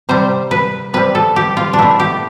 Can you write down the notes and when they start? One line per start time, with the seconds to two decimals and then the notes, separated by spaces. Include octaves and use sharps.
0.09 C3 G3 C5
0.51 B4
0.93 C3 G3 B4
1.15 A4
1.36 G4
1.57 F4
1.73 D4
1.79 B2 A3 E4
2.00 G4